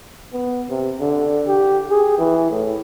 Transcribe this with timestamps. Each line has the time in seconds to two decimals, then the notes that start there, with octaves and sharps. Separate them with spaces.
0.33 B3
0.70 C3
1.00 D3
1.47 G4
1.90 G#4
2.18 E3
2.51 A2